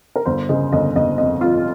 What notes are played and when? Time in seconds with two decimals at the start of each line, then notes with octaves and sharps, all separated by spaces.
0.16 A#4
0.25 G1 C5
0.49 C#3 D#5
0.72 G1 D#5
0.95 G1 D#5
1.18 F2 D#5
1.41 F2 F4